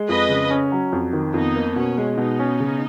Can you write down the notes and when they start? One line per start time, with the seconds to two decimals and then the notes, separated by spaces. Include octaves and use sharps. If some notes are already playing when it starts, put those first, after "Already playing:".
Already playing: G#3
0.08 F2 B4 D#5
0.29 C#3
0.50 C#4
0.72 F#3
0.93 F2
1.13 D#3
1.34 F2 B3 D#4
1.56 A#3
1.76 B2 C#4
1.98 G#3
2.18 B2 B3 D#4
2.39 C#4
2.60 C#3